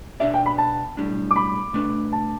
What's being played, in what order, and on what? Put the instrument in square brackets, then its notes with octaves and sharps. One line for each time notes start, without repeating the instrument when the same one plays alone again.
[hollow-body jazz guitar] B2 B3 D4 G4 D5 [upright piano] E5
[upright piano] G5
B5
A5
[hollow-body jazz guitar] B1 A2 G3 D4
[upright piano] D6
B5
[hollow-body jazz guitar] B2 A3 D4 B4
[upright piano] A5